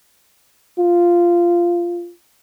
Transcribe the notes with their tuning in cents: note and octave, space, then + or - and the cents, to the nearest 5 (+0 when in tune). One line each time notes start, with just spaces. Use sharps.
F4 -10